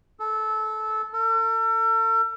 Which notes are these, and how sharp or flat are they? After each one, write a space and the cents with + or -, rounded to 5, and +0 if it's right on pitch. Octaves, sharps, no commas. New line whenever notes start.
A4 -20
A4 +40